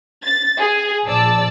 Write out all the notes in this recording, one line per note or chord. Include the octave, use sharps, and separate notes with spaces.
A6
G#4
A#1 D5 A5 E6